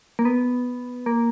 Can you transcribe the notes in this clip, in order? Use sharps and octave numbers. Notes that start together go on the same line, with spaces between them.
A#3
B3
A#3